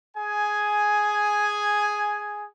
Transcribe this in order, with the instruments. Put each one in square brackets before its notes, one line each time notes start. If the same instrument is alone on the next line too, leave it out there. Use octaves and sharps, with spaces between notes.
[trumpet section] G#4 G#5